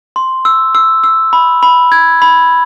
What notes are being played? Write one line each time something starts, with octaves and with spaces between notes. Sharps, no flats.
C6
E6
E6
E6
B5
B5
G#6
B5